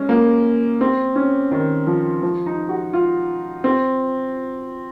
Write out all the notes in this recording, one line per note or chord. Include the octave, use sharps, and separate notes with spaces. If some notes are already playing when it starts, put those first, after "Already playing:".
Already playing: G#3 C#4
A#3
C4
C#4
D#3
F3
F3
D#4
F#4
F4
C4